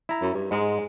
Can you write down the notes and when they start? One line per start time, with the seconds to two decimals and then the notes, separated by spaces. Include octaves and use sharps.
0.09 E4 A#5
0.21 F#2
0.34 G2
0.51 G#2 G#3